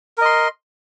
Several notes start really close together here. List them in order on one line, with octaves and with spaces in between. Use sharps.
A#4 D#5 C6